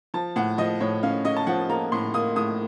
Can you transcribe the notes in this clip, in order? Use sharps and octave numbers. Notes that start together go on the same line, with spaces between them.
F3 A5
A2 F#5
F3 D#5
A2 C#5
C#4 F5
C#4 D#5
A5
F3 F#5
A#3 A#5
A2 C6
A#3 D#6
A2 D#6